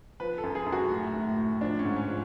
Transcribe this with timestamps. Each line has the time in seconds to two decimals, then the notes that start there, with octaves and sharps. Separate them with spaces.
0.20 F3 B4
0.38 A4
0.43 F#2
0.55 G#4
0.66 F#2
0.72 F#4
0.90 A2
1.14 A2
1.38 A2
1.61 F3 D4
1.79 C#4
1.85 G#2
1.96 C#4
2.08 F3